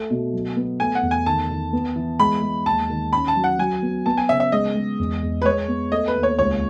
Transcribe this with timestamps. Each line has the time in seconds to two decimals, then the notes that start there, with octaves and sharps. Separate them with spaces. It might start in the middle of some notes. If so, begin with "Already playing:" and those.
Already playing: A3
0.11 B2
0.33 F#3
0.57 B3
0.80 A3 G#5
0.95 F#5
1.02 E2
1.11 G#5
1.26 D#3 A5
1.49 D#3
1.73 B3
1.96 E3
2.19 G#3 B5
2.42 G#3
2.66 D#2 A5
2.90 D#3
3.12 C#4 B5
3.28 A5
3.36 F#3
3.44 F#5
3.59 F#3 G#5
3.82 B3
4.06 B3 A5
4.17 G#5
4.29 C#3 E5
4.40 E5
4.52 G#3 D#5
4.75 G#3
4.99 E2
5.22 E2
5.42 B4
5.45 G#3 C#5
5.68 B3
5.92 A3 D#5
6.08 B4
6.15 D#2
6.23 C#5
6.39 C#2 C#5